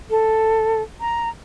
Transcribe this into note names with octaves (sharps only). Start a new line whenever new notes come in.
A4
A#5